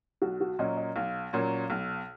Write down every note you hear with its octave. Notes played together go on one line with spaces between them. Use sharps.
B1 F#4
F#4
A#2 F#3 A#3 C#4 D#5
D#5
B1 F5
A#2 F#3 A#3 C#4
B1